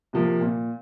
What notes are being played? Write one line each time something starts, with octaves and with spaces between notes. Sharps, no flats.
C3 F3 A#3
A#2